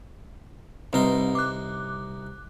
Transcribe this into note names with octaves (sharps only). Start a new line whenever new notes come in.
C2 G3 C4 D#4 B4 C6
D6 F#6